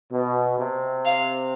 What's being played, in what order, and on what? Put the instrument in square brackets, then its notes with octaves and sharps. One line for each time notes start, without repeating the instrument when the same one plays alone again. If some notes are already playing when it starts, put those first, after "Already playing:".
[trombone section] B2
C3
[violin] F5